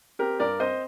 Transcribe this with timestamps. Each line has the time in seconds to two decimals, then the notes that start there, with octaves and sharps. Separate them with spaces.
0.19 C4 G4 A#4
0.40 G2 A#4 D5
0.60 C4 C5 D#5